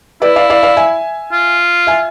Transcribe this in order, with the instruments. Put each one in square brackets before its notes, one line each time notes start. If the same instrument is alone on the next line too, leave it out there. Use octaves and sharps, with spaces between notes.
[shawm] E4 [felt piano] B4 D5
[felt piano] D5 F5
D5 F5
D5 F5
E5 G#5
[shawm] F4
[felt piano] E5 G#5